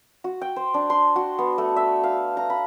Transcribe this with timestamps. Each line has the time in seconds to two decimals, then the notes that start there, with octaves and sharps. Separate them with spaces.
0.24 F#4
0.41 G5
0.56 C5
0.74 D4
0.90 C6
1.16 F#4
1.39 B3
1.58 A3
1.76 E5
2.04 F5
2.37 A#5
2.50 B5